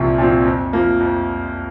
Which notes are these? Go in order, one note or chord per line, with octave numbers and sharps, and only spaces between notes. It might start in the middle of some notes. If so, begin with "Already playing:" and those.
Already playing: C2 A#2 F3 C4
A#2 F3 C4
F2
F3 A#3
F2